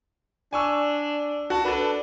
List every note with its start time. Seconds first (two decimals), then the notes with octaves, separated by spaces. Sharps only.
0.53 D4 G#5 C#6 E6
1.50 F#4 A5
1.65 D4 A4 B4